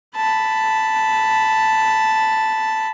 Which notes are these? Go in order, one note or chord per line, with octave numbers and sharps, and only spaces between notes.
A5 B5